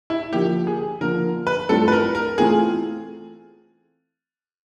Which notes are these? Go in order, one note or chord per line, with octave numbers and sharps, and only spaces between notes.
E4
D3 F3 A#3 G4
G#4
D3 F3 A#3 A#4
B4
G2 E3 A3 C4 F4 A4
B4
A#4
A#4
E3 A3 C4 F4 G#4